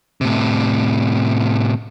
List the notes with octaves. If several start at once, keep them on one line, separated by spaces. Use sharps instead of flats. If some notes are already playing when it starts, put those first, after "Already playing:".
A2 C3